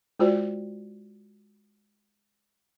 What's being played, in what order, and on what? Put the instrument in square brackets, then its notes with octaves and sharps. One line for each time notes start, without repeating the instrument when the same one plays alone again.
[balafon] G#3 F4 F#4 C5 D5